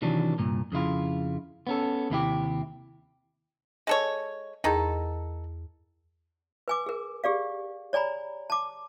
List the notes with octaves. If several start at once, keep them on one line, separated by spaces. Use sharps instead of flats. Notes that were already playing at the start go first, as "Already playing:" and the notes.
C3 D#3 E3 F#3 D4
C2 G2 A#2
F2 C#3 E4 F4
B3 C#4 A4
D#2 C3 E4 G4
G#3 A4 C#5
E2 D#3 D#4 G#4 A4
B4 G#5 D6
G#4 A#4
G4 G#4 D5 F5
C#5 D5 G#5 A#5 B5
A5 D6